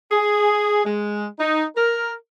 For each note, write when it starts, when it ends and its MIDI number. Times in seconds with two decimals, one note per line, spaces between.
0.12 0.85 68
0.85 1.26 56
1.39 1.64 63
1.76 2.12 70